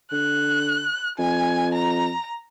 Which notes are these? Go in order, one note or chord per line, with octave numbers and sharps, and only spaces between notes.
D3 F#6
F2 G#5
A#5